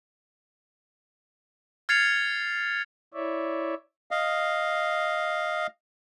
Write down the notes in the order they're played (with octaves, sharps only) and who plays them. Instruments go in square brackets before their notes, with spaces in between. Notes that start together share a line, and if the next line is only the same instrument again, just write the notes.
[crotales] F6 G#6 A6 C7 C#7 F7
[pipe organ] E4 C#5 D5 E5
[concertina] D#5 F5